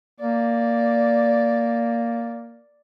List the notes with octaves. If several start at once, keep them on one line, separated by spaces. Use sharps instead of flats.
A#3 D5